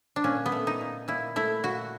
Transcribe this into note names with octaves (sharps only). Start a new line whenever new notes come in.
D4
A#2 C#4
B3
A3
D#4
A#2
A#2 E4
A3 E4
A#2 F#4